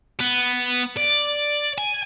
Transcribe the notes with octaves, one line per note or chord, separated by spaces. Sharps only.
B3
D5
G#5